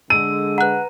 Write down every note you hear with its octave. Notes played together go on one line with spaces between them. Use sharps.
D3 G#3 E6 D#7
B4 F#5 A#5 F#6